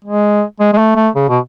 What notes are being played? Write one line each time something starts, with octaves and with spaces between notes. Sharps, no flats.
G#3
G#3
G#3
A3
A3
C#3
B2